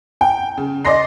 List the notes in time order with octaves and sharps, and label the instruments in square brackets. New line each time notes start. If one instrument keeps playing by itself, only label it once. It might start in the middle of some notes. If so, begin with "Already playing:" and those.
[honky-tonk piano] G5
C#3
D5 D#5 C6 A#6 C7